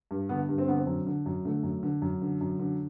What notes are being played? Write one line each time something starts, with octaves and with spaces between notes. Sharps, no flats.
G2
D3 B3
G2
C4
D3 B3
C4
F#2
D3
F#2
D3 A3
F#2
D3
F#2
D3
F#2
D3